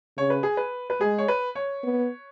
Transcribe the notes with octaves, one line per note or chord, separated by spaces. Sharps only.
C#3 C#5
B4
G#4
B4
B4
G#3 G#4
C#5
B4
C#5
B3